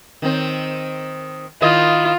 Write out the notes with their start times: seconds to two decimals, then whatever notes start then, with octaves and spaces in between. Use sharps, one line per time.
0.22 D#3 C4
1.62 D#3 E4 F4 D#5